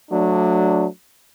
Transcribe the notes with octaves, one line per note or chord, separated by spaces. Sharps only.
F#3 A3 D4